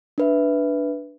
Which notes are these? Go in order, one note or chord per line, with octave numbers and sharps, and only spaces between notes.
D4 B4 E5